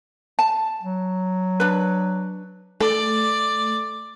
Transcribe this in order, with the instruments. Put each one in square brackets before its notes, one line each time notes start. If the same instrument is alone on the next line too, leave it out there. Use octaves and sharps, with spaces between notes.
[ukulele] A5
[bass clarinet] F#3
[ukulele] D4 B4
[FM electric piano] A3 [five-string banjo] A4 [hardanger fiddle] D5